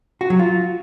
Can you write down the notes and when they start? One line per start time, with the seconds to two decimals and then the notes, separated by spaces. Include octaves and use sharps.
0.21 F#4
0.30 F#3
0.39 F4